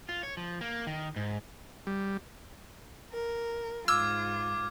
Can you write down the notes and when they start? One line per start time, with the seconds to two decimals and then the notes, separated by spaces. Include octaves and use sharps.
0.09 F4
0.23 C#5
0.37 F3
0.61 A#3
0.87 D#3
1.16 G#2
1.87 G3
3.12 A#4
3.88 G#2 F4 D6 E6 F6 G#6